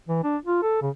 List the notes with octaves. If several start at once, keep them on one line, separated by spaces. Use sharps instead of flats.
E3
D4
F4
A4
C#3